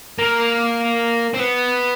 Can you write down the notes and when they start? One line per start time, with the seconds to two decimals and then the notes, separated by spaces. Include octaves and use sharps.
0.19 A#3
1.34 C4
1.39 B3